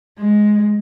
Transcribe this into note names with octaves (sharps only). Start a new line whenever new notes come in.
G#3